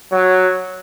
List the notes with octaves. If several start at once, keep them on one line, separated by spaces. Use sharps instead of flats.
F#3